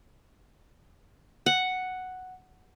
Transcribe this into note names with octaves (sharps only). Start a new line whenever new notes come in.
F#5